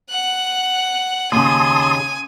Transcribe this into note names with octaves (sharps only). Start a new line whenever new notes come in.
F#5 F#6
D#2 C#3 G#5 A5 C6 D#6